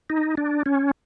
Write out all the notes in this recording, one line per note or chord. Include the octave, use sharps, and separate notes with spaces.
D#4
D4
C#4